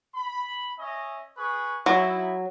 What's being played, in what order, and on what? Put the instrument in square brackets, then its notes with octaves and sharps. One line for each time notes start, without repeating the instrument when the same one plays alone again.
[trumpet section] B5
C#4 D#5 E5
G#4 B4 C#6
[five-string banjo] F#3 [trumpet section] D#4 E4